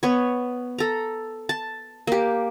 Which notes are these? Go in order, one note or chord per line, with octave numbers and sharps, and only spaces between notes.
B3 C#5
A4 A#5
A5
A#3 G4